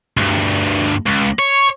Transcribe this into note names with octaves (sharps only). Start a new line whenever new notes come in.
D2 G2
C#2
C#5